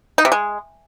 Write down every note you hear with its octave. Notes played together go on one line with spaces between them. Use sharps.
D#4
C3
G#3